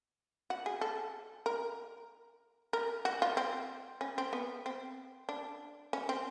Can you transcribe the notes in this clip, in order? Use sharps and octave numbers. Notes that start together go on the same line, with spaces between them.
F#4
G#4
A4
A#4
A#4
F#4
F4
C4
C#4
C4
B3
C4
D4
C#4
C4